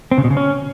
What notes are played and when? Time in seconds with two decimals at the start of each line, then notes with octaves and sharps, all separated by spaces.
0.11 C4
0.18 C#3
0.24 B2
0.30 C#3
0.37 C#4